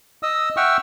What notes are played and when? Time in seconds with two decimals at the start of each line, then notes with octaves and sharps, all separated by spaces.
0.23 D#5 D#6 E6
0.57 E5 F#5 G5 C#6 E6 F6